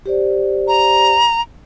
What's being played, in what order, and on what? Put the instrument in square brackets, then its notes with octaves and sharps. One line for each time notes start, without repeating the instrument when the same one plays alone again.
[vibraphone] G4 C5 D5
[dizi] A#5